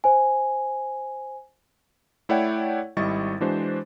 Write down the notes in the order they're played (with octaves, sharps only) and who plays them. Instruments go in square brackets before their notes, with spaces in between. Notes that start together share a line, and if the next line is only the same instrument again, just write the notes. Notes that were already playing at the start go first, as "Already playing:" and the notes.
[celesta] C5 G#5
[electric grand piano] A3 E4 C#5 D5 F#5 G5
G#1 G3 E4 D#5 C#6 A6
E3 G#3 D4 F#4 C5